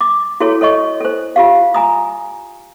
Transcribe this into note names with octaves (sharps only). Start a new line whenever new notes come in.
D6
E4 F#4 G#4 A4 C#5
A4 C#5 D#5 C#6
A4 C5
F4 G4 F5
G#5 A#5 D#6